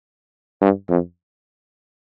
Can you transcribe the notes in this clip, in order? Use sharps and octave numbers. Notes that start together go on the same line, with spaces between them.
G2
F2